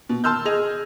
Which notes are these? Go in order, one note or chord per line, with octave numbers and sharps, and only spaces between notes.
B2
A5 C6 E6 F6 G6
G#4 D#5 F7